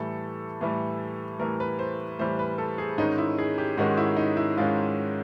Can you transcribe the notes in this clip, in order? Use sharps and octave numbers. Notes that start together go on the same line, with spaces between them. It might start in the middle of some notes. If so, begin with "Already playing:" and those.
Already playing: A2 E3 G3 A4
A2 E3 G3
A2 E3 G3 A#4
B4
C5
A2 E3 G3 C5
B4
A4
G#4
G#2 D#3 G#3 C#4 D#4
E4
G#4
G4
G#2 D#3 G#3 C#4 F#4
E4
D#4
E4
G#2 D#3 G#3 C#4 F4